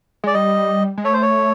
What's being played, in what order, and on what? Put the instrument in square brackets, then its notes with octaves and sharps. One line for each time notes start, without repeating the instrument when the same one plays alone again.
[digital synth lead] G#3 [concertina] D5
[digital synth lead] G3 [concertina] D#5
[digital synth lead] G#3
[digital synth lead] A3 [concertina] C#5
[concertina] C5
C#5